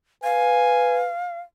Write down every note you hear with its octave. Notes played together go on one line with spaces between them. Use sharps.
B4 F5 G#5